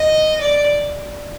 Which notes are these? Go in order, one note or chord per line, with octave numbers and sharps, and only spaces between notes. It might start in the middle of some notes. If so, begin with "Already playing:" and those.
Already playing: D#5
D5